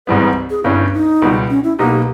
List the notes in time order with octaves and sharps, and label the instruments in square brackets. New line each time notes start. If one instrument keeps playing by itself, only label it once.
[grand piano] G#1 G#2 E3 G3 B3 [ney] B4
[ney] G#4
[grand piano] G1 G2 G3 C#4 [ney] E4
[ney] D#4
[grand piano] C#2 B2 G3
[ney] C#4
E4
[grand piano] B1 B2 A#3 D#4 [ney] G4